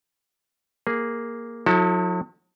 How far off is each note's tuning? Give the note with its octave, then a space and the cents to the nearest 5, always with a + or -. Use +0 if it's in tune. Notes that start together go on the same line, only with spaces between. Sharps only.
A#3 +0 G#4 +0
F#3 -45 E4 -40 A4 +10